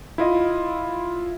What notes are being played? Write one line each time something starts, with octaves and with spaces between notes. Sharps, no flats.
E4 F4 D#5